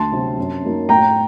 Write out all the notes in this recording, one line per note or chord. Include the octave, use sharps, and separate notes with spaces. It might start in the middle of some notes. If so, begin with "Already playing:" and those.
Already playing: D2 A5 C6
C3 F#3 C4
F#2
F#3 A#3 D#4
A2 G5 A#5